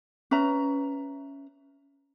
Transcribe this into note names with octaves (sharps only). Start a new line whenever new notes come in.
C#4 B4 E5 A#5